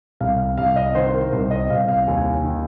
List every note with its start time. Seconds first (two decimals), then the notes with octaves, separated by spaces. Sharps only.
0.20 C2 F5
0.58 C2 F5
0.76 D#5
0.95 D#3 C5
1.07 C5
1.14 A#4
1.33 C2 C5
1.51 D#5
1.70 C2 F5
1.88 F5
2.07 D#2 G#5
2.44 D#3